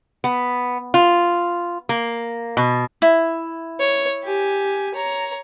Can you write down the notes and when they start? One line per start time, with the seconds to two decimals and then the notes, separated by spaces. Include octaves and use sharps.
0.24 B3
0.94 F4
1.89 A#3
2.57 B2
3.02 E4
3.80 C#5
4.24 G4 G#5
4.95 C#5 A#5